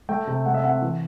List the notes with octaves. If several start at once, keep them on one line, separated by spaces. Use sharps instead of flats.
A3 G5
C3
A3 F#5
E5
C4 F#5
E3